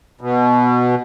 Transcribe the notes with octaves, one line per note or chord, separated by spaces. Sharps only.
B2